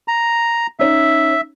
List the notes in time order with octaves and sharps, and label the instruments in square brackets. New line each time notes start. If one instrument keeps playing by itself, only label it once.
[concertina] A#5
[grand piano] C#4 D#4 [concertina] E5